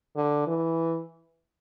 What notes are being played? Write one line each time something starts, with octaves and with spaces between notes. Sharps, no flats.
D3
E3